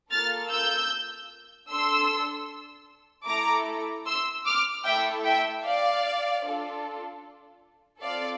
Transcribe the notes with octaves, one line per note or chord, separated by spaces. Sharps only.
A#3 F4 A4 F6 A6
E6 G6
D4 A4 C6 E6
A3 E4 A4 A#5 D6
C6 E6
D6 F6
A3 E4 A4 E5 G5
E5 G5
D5 F5
D4 F4 A4
C4 F4 A4 D5 F5